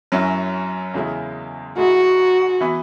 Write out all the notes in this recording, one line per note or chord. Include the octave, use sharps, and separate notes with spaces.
F#2 F#3 C#4 E4
E2 C#3 G#3 E4
G#2 G#3 E4 F#4
E3 B3 E4